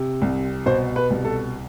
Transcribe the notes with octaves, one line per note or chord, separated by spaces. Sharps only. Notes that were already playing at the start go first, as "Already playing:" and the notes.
Already playing: C3
C2
B2 C5
B4
C2
A4